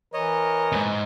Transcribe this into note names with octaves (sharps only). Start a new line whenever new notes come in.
E3 A#4 C#5 D#5
E2 G#2